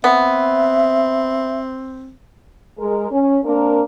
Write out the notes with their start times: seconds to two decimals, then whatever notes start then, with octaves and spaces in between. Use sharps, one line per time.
0.04 B3 C4 E5
2.78 G#3 A#4
3.10 C#4
3.44 A#3 C4 D4 A#4